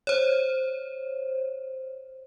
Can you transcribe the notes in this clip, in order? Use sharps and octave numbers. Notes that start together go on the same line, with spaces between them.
C5 C#5